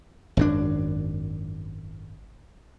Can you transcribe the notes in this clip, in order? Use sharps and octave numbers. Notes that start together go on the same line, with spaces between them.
G#1 F#2 D4